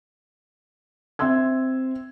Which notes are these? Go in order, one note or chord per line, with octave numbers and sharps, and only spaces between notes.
C4 E5 C6 E6 G#6